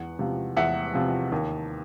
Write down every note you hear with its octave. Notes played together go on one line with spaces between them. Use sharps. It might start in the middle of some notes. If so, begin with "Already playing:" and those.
Already playing: E2 F#5
C3 F3
E2 E5 F#5
C3 F3
D#2